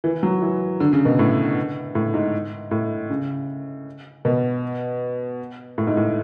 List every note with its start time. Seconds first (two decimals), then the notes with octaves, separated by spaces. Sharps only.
0.04 E3
0.23 F#3
0.42 E3
0.80 D3
0.93 C#3
1.05 B2
1.19 A2
1.95 A2
2.14 G#2
2.71 A2
3.10 C#3
4.25 B2
5.78 A2
5.87 G#2
5.97 A2